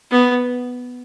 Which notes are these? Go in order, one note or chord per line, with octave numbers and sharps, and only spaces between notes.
B3